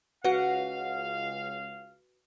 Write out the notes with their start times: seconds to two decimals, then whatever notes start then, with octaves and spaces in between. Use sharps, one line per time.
0.24 C#2 F#4 B4 F5 F#5